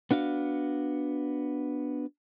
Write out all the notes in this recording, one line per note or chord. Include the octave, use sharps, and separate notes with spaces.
B3 D4 F#4 F5